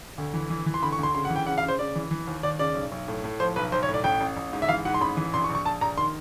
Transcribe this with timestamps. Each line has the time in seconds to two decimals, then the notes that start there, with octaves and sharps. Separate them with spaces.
0.18 D2
0.34 E3
0.50 E3
0.66 E3
0.74 C6
0.82 D2 B5
0.93 C#6
0.99 D2 C6
1.15 C#3 C6
1.25 F#5
1.30 E3
1.36 G5
1.47 C#3 F#5
1.58 F5
1.63 C#3
1.68 C5
1.79 C#3 D5
1.95 E3
2.11 E3
2.27 D#2
2.43 D#2 D5
2.59 C#3 D5
2.75 B1
2.92 B1
3.08 A2
3.24 A2
3.40 F3 C5
3.56 B1 B4
3.72 B1 C5
3.83 C#5
3.89 A2
3.94 D5
4.04 A1 G5
4.21 A1
4.37 A1
4.53 G#2
4.62 E5
4.69 E3 F5
4.85 G#2 F#5
4.94 C6
5.01 A1 B5
5.17 E3
5.33 A#1 C6
5.44 C#6
5.50 A#1
5.55 C#6
5.65 A#1 A5
5.81 A#1 A#5
5.98 D#3 C6